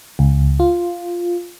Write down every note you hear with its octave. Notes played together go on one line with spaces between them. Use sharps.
C#2
F4